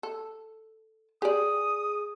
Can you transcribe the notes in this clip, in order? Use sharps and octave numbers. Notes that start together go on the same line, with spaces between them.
A4
G4 G#4 D5 D#6